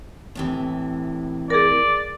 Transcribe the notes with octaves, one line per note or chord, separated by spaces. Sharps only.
A2 C3 E3
G#4 A#4 D5